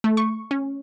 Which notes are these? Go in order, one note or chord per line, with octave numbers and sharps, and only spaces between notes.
A3
C#6
C#4